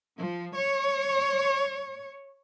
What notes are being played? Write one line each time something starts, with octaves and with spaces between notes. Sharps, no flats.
F3
C#5